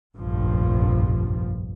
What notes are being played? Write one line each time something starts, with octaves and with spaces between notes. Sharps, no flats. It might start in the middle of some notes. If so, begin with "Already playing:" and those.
F1 A#1 G2 F3